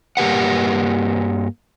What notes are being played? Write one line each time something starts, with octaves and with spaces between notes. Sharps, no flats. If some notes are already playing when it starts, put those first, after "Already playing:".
G2 A#3 G4 B4 F#5